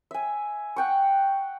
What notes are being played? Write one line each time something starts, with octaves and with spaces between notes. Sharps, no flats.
E5 G#5
F#5 G5 C#6